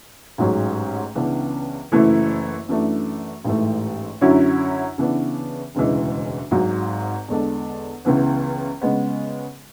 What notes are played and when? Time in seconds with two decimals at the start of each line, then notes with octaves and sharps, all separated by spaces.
0.38 A1 G#2 F#3 C#4 G#4
1.15 C#2 C#3 E3 B3 D4
1.92 F#1 F#2 E3 A3 E4
2.68 F#2 E3 A3 D4
3.44 A1 G#2 E3 A3
4.21 F#2 D3 F#3 C#4 E4
4.98 C#3 E3 B3 D4
5.75 E1 D2 C#3 E3 G#3
6.51 G#1 G#2 F#3
7.28 E2 D3 G#3 D4 A4
8.05 C#2 C#3 E3 B3
8.81 C#3 G#3 B3